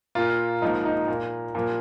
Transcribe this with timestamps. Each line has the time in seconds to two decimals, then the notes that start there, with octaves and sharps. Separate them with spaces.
0.15 A#2 A#3 F4
0.62 G#2 F3 A#3 D#4
0.85 D#4
1.08 A#2 A#3
1.55 A#2 F3 A#3